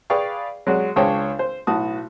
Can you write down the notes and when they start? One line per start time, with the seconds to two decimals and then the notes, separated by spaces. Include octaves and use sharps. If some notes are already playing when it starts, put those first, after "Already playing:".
0.10 G#4 B4 D5 F5 G5 C#6
0.67 F#3 G#3 F#4 D5
0.96 C#2 D4 G#4 C5 C#5 G5
1.39 C5
1.67 B1 A2 F#4 A5 D#6